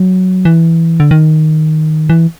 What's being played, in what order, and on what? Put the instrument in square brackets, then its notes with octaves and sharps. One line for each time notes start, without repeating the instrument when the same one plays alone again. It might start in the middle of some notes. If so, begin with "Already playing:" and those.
Already playing: [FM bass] F#3
E3
D3
D#3
E3